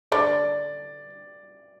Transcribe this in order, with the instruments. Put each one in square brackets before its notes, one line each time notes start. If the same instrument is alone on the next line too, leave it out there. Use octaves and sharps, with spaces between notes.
[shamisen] D3 D4 [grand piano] D5